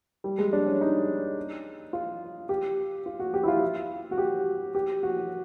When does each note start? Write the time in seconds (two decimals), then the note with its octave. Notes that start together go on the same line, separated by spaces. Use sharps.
0.24 G3
0.39 G#3
0.53 D4
0.66 C#4
0.81 D#4
1.93 F4
2.49 G4
3.06 F4
3.19 F#4
3.34 G4
3.43 E4
3.48 F4
4.11 F#4
4.18 G4
4.75 G4
5.03 F#4